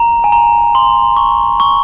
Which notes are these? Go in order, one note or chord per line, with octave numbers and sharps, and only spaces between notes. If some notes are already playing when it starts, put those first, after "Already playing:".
Already playing: A#5
G#5
A#5
C6
C#6
C#6